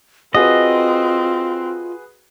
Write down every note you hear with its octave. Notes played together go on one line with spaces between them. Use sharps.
C4 F4 F#4 G#4 B4 D#5